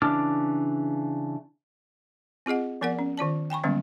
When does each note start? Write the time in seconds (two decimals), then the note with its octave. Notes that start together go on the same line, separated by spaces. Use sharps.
0.02 C#3 E3 D4 D6 F6
2.46 C4 F4 G#4 D#5 F#5
2.81 F3 B3 A#4 D5 F#5
2.99 C#4
3.17 D#3 F4 D5 A5
3.50 G5 G#5 B5 C#6
3.64 D3 F#3 G3 A#3 B3 C#4